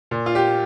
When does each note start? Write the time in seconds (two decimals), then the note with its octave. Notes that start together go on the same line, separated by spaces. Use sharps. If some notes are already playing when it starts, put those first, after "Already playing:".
0.11 A#2
0.26 F4
0.35 G4